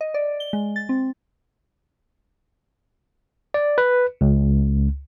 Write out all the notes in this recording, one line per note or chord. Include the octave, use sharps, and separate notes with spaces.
D#5
D5
G7
G#3
A6
C4
D5
B4
C#2